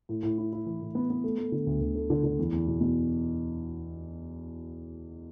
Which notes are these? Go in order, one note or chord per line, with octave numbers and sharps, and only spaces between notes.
A2
A2
E4
E4
E3
A2
B3
B3
A3
A3
D3
D2
D2
A3
D3
D3
E2
E2
B2
B2